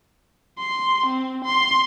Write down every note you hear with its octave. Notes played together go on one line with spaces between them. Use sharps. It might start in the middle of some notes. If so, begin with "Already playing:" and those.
C6
C4
C6